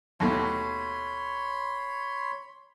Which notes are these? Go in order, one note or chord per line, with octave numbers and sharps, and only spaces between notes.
D#2 B2 A3 C#5 B5 C6